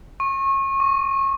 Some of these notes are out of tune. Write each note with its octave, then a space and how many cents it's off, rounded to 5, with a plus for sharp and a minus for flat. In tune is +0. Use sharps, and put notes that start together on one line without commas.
C#6 -30
C#6 +35